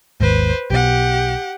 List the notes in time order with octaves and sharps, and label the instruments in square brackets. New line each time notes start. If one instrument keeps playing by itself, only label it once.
[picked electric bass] G#1 D#2 G#2 [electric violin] B4 C5
[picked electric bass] B1 B2 [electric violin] G4 F#5